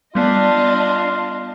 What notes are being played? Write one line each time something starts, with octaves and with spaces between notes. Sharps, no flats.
G3 B3 D4 F4 D#5